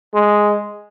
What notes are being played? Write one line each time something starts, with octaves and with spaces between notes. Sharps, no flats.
G#3